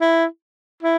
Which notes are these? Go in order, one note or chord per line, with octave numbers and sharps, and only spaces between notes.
E4
E4